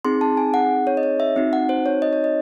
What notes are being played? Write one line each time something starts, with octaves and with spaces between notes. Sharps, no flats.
C4 D#4 G#4 C6
A5
G#5
F#5
C#5
D#5
C#5
E5
C4 D#4 F#4
F#5
C5
C#5
D#5
C#5
D#5